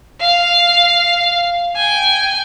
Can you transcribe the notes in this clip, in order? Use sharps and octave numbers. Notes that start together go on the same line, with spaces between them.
F5
G5 G#5